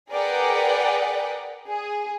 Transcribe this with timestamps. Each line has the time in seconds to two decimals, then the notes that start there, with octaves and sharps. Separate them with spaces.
0.11 G#4 A#4 B4 D5 F#5 G5
1.68 G#4